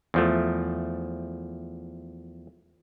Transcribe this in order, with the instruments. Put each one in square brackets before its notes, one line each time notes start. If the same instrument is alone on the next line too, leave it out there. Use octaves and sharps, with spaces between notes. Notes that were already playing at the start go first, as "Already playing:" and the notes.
[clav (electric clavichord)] E2 F3 A3